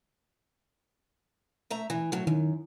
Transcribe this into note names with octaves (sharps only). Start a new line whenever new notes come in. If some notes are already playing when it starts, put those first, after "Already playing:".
A3 E5 A#5
E3
A2 F#3
F#2 D#3